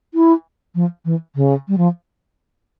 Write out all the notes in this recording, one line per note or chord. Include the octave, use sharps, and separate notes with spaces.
E4
F3
E3
C#3
G3
F3